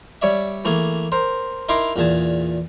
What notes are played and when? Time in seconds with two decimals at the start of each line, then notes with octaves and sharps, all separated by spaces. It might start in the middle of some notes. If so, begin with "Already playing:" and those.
0.22 G3 C#5 D5 E5
0.65 E3 A3 A#3 G#4
1.12 A#4 C5
1.69 D#4 E4 A#4 A#5 C6 D6
1.96 E2 A#2 G#4 A5